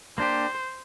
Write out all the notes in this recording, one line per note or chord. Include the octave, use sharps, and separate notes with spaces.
A#3 D4 G4 C5